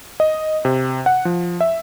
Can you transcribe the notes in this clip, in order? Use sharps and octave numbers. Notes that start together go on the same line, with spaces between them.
D#5
C3
F#5
F3
E5